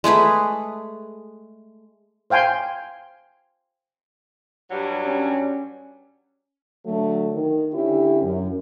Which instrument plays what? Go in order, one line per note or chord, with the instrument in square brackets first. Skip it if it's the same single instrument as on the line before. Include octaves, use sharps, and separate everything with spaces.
[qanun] G#3 A3 G#4 B4
[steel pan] C5 F5 G5 G#5 C6
[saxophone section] G2 F#3 G3
[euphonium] C#4
[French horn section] D3 F#3 A3
D#3
D3 C#4 E4 G4
F#2